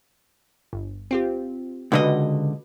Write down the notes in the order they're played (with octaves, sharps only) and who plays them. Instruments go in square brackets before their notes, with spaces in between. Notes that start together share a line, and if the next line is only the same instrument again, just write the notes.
[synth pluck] G1
C4 F4 G4
[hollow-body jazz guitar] C#2 D3 D#5 [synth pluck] F#4 B4